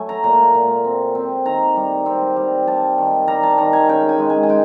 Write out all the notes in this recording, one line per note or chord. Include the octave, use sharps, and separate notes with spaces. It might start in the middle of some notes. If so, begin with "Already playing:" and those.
Already playing: F#3 A3 G#5
A#5
A#2 A#5
A#2
C4
C4
D#3 A#5
G3
C4
G3
G3 A5
D#3
G3 A#5
A5
D#3 A#5
G#5
C#3 G5
G#5
G#3
G#5
G#5
G#3 G5